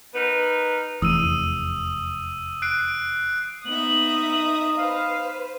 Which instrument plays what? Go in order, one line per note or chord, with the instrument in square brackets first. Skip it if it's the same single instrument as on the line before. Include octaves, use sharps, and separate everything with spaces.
[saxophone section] D#4 A#4 B4
[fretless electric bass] F1 E2 [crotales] D#6 E6 D#7
[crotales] F#6 C7 D7
[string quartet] B3 E5 [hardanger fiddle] D#4 D#6 [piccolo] F#7
[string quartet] B4 C5 [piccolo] F5